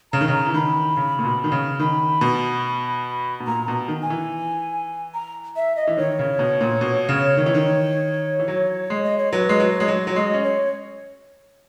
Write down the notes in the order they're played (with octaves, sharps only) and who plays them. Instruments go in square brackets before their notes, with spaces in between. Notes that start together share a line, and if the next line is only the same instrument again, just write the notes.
[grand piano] C#3 [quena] A#5
[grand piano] D#3
C#3
E3
[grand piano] D#3 [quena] B5
[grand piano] C#3
A#2
B2
D#3
C#3
[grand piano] D#3 [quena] B5
[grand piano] B2
B2
[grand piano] A#2 [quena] A#5
[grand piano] B2
D#3
[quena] G#5
[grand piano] E3
[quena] A#5
E5
D#5
[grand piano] E3
[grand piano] D#3 [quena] C#5
[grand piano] C#3
B2
A#2
B2
C#3
D#3
E3
D#3
E3
F#3
G#3
[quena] D#5
C#5
[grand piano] F#3 [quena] B4
[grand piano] G#3
F#3
[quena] C#5
[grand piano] G#3
F#3
F#3
[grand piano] G#3 [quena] D#5
[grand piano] C#4
[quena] C#5